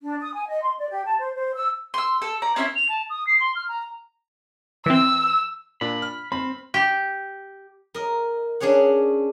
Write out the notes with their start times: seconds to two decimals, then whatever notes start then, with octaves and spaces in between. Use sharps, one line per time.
0.02 D4
0.20 D#6
0.33 G#5
0.48 D#5
0.62 C6
0.79 D5
0.90 G4
1.05 A5
1.19 C5
1.34 C5
1.55 E6
1.94 C6 E6
2.22 A4 E6
2.42 D5 A#5
2.56 C4 C#4 E4 E5
2.75 F7
2.89 A5
3.10 D#6
3.27 C7
3.40 C6
3.55 F6
3.69 A#5
4.86 E3 C4 E6
5.81 A#2 D4 B5
6.02 F6
6.32 C4 B5
6.74 G4
7.94 A#4 D#5
8.60 C#4 D4 G#4 C#5 F#5